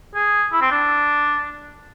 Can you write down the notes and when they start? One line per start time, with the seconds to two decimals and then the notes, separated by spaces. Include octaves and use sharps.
0.15 G#4
0.52 E4
0.61 C4
0.71 D4